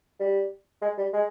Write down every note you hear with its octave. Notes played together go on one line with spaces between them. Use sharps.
G3
G#3
G3
G#3